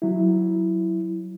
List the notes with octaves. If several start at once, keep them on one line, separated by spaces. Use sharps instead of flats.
F#3 E4